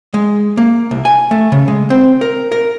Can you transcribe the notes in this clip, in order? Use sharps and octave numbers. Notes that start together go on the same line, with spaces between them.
G#3
A#3
C2
G#5
A3
C#3
G#3
C4
A#4
A#4